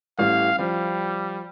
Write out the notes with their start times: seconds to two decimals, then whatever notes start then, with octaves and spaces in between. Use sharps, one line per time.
0.19 A1 E3 G3 F5
0.59 F3 G3